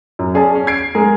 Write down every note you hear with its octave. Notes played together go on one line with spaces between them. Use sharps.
F#2
C#4 G#4 D5 A5
C#4
G#6 C7 D7
G#3 G#4 A#4